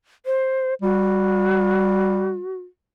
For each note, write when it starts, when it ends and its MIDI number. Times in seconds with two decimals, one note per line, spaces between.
0.26 0.74 72
0.82 2.39 55
0.82 2.57 66